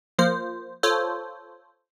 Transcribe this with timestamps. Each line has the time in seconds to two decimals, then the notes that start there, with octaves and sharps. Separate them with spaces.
0.19 F3 A#3 C5
0.83 F4 A4 C5 C#5